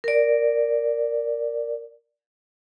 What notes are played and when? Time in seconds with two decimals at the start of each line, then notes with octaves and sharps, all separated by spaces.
0.04 A#4 D5